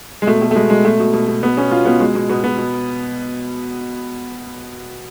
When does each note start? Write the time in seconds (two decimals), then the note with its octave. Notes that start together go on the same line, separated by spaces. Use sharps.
0.22 G#3
0.27 B2 A3
0.41 B2 A3
0.51 A3
0.55 B2 G#3
0.70 B2 G#3
0.85 B2 A3
1.00 B2
1.13 B2
1.28 B2
1.43 B2 B3
1.57 B2 C#4
1.71 B2 F4
1.85 B2 B3
2.00 B2 G#3
2.15 B2
2.29 B2 B3
2.44 B2 B3
2.58 B2